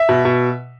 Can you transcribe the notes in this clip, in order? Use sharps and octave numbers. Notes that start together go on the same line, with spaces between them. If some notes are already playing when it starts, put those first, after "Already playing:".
Already playing: E5
B2
B2